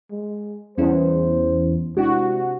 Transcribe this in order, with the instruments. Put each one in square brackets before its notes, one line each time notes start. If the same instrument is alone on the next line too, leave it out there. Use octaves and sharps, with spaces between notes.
[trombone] G#3
[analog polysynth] E2 [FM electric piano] G3 C#4 E4 [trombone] C5
[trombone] C3 [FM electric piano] G#3 D4 E4 [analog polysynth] F#4